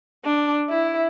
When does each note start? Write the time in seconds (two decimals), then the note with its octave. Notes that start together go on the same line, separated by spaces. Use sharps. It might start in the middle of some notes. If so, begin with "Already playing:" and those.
0.25 D4
0.70 E4